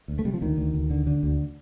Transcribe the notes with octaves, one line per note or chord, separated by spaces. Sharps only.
D2
A3
C3 G3
F3
D2 D#3
D2
D2
D3
D3
D2